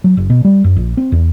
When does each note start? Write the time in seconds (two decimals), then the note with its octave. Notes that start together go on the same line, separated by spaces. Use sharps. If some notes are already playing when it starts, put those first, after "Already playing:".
0.04 F#3
0.17 F#1
0.30 B2
0.45 G3
0.64 F#2
0.76 A#1
0.97 C4
1.12 E2